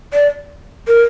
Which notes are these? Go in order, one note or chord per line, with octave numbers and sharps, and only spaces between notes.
D5
A#4